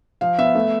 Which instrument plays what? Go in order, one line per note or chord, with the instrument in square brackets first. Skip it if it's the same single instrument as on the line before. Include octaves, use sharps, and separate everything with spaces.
[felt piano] F3 F5
B3 E5
A3